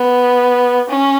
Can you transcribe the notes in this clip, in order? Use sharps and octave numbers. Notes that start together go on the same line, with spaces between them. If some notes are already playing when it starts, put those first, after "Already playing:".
Already playing: B3
C#4